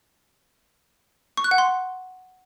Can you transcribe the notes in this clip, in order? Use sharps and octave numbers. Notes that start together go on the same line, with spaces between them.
C#6
F#6
F#5
C6